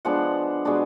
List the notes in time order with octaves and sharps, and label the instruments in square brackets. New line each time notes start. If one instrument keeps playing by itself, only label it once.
[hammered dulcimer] F3 G#3 B3 D4 F#5
B2 G#3 B3 D4